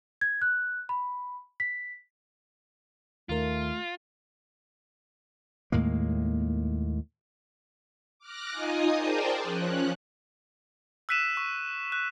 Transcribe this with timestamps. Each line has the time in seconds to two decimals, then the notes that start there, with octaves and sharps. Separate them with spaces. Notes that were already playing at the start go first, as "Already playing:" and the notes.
0.21 G#6
0.42 F#6
0.89 B5
1.60 B6
3.29 D#2 D#3 A3 F4 A#4
5.72 D#2 A2 G#3 A#3
8.19 D6 F6 F#6 A#6
8.51 D#4 F4 D#5 G#5 D#6
8.95 G#4 A#4 C5 D5 G5 A5
9.43 F3 C#4 F#6
11.09 E6 F#6 B6 D#7 E7
11.37 C#6
11.92 F#6